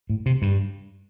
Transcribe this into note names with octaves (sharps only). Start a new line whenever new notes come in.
A2
C3
G2